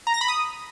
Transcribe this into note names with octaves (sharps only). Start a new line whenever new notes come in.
A#5
A#6
B5
D#6